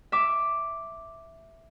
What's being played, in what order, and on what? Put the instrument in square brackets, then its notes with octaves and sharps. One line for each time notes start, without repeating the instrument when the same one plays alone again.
[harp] E5 D6